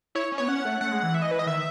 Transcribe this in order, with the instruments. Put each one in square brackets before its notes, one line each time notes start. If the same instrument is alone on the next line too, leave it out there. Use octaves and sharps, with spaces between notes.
[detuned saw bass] E4 [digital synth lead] C#5
[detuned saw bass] C#4
[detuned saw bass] B3 [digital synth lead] C#5
[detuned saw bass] C#4 [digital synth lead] F#5
[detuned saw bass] A3
[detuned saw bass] A3 [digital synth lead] F#5
[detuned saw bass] G#3
E3
[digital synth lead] E5
D#5
B4
D#5
[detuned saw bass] D#3 [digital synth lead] E5